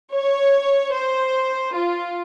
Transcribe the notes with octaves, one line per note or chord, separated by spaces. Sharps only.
C#5
C5
F4